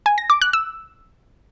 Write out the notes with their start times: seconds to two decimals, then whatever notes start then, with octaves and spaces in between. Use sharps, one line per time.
0.06 G#5
0.18 A#6
0.30 D6
0.42 F#6
0.53 E6